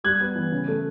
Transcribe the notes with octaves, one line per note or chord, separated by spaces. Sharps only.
G3 F#6 G#6
B3
E3
C#3
A3